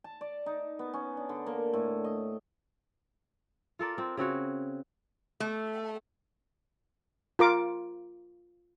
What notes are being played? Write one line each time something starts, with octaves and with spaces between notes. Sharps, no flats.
A5
D5
D#4
B3
C#4
D4
D3
A#3
A2
D#5
F4 A4 A#4 D5
C4 F4
C#3 C4 F#4 C#5
A3
F4 A#4 D6